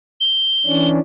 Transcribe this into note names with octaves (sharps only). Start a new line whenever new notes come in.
G7
E3 C#4 D4